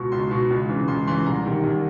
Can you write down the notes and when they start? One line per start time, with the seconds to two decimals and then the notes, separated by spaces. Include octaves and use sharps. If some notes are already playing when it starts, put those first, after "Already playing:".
Already playing: C#2 B2 C#6
0.12 C#2 C6
0.31 B2
0.50 C#2
0.69 C#3 E3
0.88 C#2 C6
1.07 C#3 E3 C6
1.26 C2 A#5
1.45 C3 D#3
1.63 C2